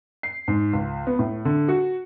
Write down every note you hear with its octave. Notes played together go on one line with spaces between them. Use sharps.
C7
G#2
C#2
B3
A2
D3
F#4